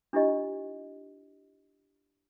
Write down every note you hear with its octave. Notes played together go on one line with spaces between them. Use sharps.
D4 E4 F4 G4 D#5